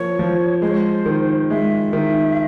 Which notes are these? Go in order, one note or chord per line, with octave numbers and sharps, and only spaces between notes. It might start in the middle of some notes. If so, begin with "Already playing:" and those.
Already playing: F3 A#3 C#5
F3
G#3 C5
C#5
C5
D#3
G#3 E5
D#3